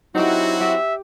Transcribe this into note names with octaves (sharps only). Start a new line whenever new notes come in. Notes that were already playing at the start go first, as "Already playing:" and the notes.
F#3 C4 D#4 E4 F#4 G4
G4 E5